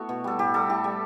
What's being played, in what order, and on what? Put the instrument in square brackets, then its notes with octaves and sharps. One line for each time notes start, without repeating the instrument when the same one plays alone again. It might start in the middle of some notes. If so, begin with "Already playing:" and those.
Already playing: [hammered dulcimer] A3 B3 E4 F#4
B2
G3 A4
A2 G4
G3 A4
A2 G4
G3